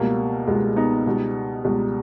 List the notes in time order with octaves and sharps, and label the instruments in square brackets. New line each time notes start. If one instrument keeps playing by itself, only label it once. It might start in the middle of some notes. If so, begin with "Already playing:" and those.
Already playing: [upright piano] C#2 B2 G3 A#3
C#2 B2 G3 G#3 B3
B3 D#4
C#2 B2 G3
C#2 B2 G3